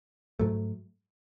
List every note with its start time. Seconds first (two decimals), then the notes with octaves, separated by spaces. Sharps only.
0.39 G#2 F#3 A3